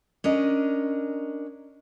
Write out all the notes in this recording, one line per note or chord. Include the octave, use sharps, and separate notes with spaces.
C#4 D4 A#4 D#5